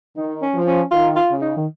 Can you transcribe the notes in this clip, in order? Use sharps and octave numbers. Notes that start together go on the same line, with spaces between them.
D#3 D#4
C#4
F3
C#4
D#3 F4
F4
C#3
D#4
D#3